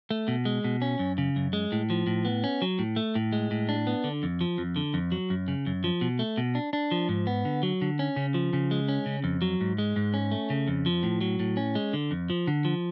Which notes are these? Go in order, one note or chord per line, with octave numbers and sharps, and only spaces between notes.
A3
B2
G#3
B2
C#4
F#2
C#3
F#2
G#3
A2
F3
A2
B3
C#4
F#3
A2
A3
A2
G#3
A2
D4
B3
D3
F2
F3
F2
D3
F2
F#3
F#2
C#3
F#2
F3
B2
A3
B2
D4
D4
F3
G#2
B3
D3
F#3
D3
C#4
C#3
F3
C#3
G#3
C#4
C#3
F2
F#3
G#2
G#3
G#2
C#4
A3
C#3
F2
F3
A2
F#3
A2
C#4
G#3
D3
F2
F3
D3
F3